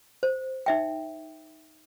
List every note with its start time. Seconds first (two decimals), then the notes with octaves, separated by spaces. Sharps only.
0.23 C5
0.66 D#4 E5 G5